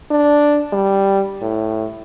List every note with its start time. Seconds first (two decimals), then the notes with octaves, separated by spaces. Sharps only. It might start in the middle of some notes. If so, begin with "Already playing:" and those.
0.11 D4
0.73 G3
1.42 A2